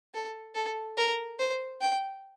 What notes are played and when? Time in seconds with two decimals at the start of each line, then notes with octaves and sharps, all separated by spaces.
0.14 A4
0.55 A4
0.97 A#4
1.39 C5
1.81 G5